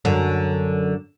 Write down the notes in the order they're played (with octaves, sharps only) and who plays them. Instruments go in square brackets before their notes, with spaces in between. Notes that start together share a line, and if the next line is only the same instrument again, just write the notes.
[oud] F#2 D3